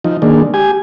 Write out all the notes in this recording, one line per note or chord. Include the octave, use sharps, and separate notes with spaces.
F3 D#4
D#3 G#3 A#3 D4
G4 G#5